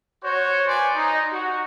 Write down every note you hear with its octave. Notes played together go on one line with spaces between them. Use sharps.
F#4 C5 C#5
B4 D5 G#5 C6
D#4
F#4